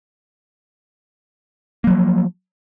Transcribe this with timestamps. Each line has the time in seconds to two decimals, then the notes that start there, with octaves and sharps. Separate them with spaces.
1.84 A#3
1.87 F#3
1.90 F3